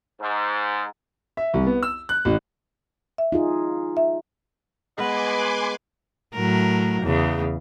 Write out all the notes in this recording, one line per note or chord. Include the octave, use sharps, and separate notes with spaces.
G#2
E5
C2
B3
E6
F#6
A1
E5
D#4 F4 G#4
E5
G#3 B3 B4 D#5 G#5 C6 D6
A2 F#3 A#4
E2 C#3